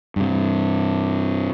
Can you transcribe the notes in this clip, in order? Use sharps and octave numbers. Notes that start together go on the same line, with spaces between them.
G2 C3